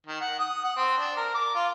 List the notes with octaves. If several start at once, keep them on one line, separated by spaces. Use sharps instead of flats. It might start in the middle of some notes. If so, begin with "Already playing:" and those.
D#3
F#5
D#6
F#5
C4
D4
A#4
D6
F4